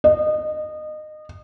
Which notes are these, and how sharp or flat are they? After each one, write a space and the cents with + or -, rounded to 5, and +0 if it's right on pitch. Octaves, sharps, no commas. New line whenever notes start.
D#5 -25